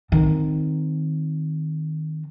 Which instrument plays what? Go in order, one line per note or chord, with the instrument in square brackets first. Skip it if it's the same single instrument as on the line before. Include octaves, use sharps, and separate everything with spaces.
[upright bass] D#3 C4